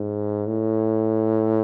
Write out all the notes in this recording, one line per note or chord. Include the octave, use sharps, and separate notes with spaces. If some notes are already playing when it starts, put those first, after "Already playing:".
Already playing: G#2
A2